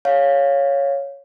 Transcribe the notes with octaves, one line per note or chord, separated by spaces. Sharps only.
C#5 F5